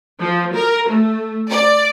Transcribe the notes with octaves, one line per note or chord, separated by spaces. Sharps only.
F3
A#4
A3
D5